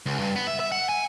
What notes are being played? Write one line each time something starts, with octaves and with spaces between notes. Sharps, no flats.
C#2
G2
B3
E5
E5
F#5
G#5